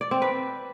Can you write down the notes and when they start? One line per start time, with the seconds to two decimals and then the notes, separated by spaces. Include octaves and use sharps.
0.01 D5
0.11 C4
0.22 B4